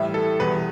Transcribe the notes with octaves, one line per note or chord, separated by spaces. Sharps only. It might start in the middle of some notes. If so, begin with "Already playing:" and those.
Already playing: A2 E3 G3 E5
A4
E2 B2 G3 B4